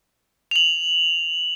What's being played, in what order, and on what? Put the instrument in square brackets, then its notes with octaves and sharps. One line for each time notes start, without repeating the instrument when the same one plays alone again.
[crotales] F7 F#7